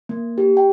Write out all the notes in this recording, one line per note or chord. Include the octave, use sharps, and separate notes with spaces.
A#3
G4
G5